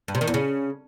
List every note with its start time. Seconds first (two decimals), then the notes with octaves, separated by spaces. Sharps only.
0.08 G2
0.15 C3
0.21 D#3
0.27 E2
0.34 C#3